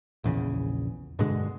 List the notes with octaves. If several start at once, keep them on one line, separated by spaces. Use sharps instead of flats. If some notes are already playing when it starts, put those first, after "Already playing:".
A#1 E2 C#3
G2 B2 D3 G#3